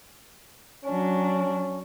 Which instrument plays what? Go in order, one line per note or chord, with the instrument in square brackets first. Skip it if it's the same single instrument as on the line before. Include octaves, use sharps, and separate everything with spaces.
[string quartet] F#3 D4 [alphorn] C#4